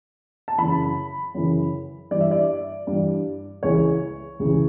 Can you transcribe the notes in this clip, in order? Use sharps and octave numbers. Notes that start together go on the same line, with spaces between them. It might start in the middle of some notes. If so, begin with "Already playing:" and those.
A5
F#2 C#3 E3 B5
F#2 C#3 E3
G2 E3 D5
E5
D5
G2 E3
C#2 C#3 E3 C#5
C#2 C#3 E3